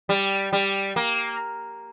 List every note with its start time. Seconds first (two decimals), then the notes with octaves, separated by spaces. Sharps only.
0.09 G3
0.53 G3
0.96 A#3